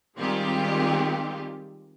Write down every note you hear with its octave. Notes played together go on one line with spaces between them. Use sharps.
D#3 G3 G#3 C4 F4 G4